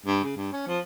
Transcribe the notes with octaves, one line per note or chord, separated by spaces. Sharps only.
G2
C#3
G2
C#4
F3